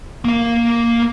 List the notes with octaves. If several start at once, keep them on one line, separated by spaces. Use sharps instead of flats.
A#3 F5